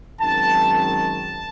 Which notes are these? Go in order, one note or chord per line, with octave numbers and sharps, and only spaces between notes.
F#2 D#3 G#3 C4 A5
A5